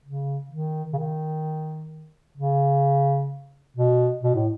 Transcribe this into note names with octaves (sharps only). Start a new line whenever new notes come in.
C#3
D#3
C#3
D#3
C#3
B2
B2
A2